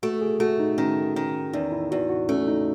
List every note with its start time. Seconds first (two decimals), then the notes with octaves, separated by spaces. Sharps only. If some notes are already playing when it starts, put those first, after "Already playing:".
0.03 A3 F#4
0.21 G#4
0.40 A3 F#4
0.59 D#4
0.78 D#3 C#4
1.16 D#3 C#4
1.53 E2 D#4
1.72 E4
1.91 E2 F#4
2.10 F#4
2.29 A3 C#4
2.48 D#4